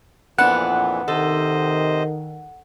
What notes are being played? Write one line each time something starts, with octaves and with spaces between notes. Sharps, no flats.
F2 A#2 E3 B3 D4 F#5
C3 D#3 A4 C5 D#5